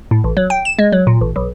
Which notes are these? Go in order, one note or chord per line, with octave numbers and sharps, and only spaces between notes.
A2
A1
F#3
G5
E7
G#3
F#3
A#2
A1
B1